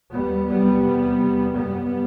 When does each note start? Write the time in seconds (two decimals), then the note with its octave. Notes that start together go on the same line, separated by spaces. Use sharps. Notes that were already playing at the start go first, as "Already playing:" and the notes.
0.13 D#2 G3 B3
0.49 E2 C3 G3 B3
0.84 E2 C3
1.20 E2 C3
1.55 F#2 G3 B3